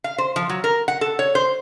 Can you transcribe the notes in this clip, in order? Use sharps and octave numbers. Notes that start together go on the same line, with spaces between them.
F5
C5
F3
F#3
A#4
F#5
A4
C#5
C5